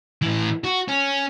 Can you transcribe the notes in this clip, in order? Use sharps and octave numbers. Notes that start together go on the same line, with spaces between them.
A2 E3
F#4
C#4